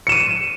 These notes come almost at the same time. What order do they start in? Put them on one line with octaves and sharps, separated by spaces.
C#7 E7 D#7